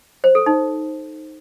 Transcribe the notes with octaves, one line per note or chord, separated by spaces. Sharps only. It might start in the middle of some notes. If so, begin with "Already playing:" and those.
C5
A4
D#4